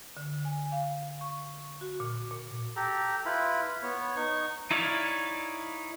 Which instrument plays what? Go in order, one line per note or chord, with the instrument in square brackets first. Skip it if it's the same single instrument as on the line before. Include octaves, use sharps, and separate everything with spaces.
[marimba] D3
G#5
F5
C#6
F#4
A#2
A#2
[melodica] G4 A4 A#5
E4 F4 B4 B5
B3 C#5
D#4 C#6
[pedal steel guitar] D#4 E4 C#5 D5 F5